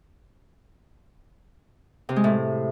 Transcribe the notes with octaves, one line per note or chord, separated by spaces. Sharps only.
C3
G#3
A2